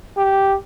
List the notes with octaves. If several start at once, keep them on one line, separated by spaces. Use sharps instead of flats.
G4